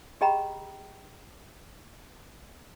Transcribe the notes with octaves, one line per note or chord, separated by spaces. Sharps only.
G4 G#4 D#5 G5 A#5 B5